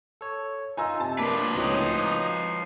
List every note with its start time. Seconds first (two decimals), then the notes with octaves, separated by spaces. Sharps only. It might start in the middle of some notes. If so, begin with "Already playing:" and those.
0.21 A4 C#5
0.77 D#4 F4 G#5 A#5 E6
1.00 C3 A5
1.19 F3 A#3 D4 B4
1.55 C#2 A2 C4 D#4 F#4 C#5
1.94 D6 D#6 F#6